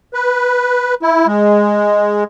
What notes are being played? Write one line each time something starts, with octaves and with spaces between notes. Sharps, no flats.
B4
E4
G#3